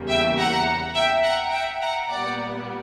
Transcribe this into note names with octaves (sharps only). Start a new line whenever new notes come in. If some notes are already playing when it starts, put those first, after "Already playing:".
Already playing: E2 C#3 G3 A#3
E5 G5
F#5 A#5
E5 G5
F#5 A#5
E5 G5
F#5 A#5
A#2 G3 B3 D5 F#5